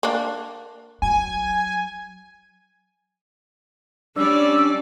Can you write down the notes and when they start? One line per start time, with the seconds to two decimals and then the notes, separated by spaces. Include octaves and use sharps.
0.03 A#3 D4
1.02 F#3 G#5
4.16 G3 C#4 D4 D5 E6